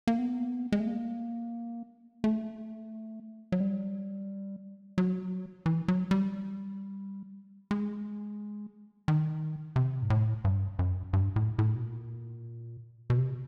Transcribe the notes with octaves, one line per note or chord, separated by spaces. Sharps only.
A#3
B3
G#3
A3
A#3
A3
F#3
G3
F#3
E3
F#3
G3
G#3
D#3
C3
G#2
A2
G2
F#2
G2
A2
A2
B2
A#2
B2
C3